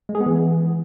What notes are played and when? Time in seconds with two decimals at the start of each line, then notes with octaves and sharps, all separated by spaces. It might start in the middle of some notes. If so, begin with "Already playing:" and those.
0.09 G#3
0.15 G#4
0.21 B3
0.26 E3